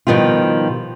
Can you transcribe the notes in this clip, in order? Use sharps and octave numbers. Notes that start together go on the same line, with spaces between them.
B2 D#3 F3 G3 F4